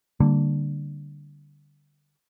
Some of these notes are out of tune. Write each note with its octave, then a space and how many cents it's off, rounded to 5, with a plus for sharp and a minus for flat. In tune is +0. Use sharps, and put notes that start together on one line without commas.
D3 +0 G3 +0 A#3 -25